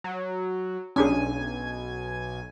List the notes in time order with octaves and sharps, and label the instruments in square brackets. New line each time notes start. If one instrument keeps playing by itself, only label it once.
[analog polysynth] F#3
[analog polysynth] B1 G#5 [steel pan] C#4 D4 G#4